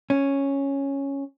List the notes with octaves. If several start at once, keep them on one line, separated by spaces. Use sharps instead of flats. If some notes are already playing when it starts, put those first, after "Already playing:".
C#4